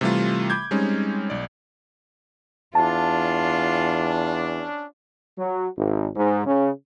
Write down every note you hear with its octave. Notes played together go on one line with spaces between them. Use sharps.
C3 E3 G3 A3 F4
B5 D6 G6 G#6
G3 G#3 C4 C#4 D#4
B1 D5
E2 C#4 D4 F4 A5
F#3
G#1
G#2
C#3